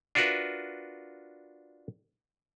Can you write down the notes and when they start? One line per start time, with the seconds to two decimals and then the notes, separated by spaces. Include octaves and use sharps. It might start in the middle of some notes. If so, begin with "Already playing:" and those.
0.15 D4 F4 F#4 A#4 B4 E5